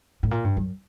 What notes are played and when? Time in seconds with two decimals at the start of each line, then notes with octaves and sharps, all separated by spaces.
0.23 A2
0.31 A#2
0.44 G2
0.57 F#2